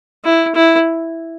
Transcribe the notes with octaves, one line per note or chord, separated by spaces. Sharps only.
E4
E4